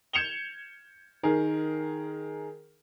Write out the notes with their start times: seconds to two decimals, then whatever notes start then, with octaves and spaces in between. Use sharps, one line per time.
0.13 G6 G#6 C#7 E7 F7 G7
1.23 D#3 G#4 A#4